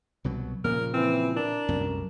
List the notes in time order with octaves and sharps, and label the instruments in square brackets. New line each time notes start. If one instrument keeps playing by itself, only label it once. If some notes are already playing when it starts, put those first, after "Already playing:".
[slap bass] C2 B2 F#3
[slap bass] A#2 C#3 F3 [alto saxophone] A#4
[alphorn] E3 [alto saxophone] C4
[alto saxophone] D4 [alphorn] A#4
[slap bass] C2 F#2 A2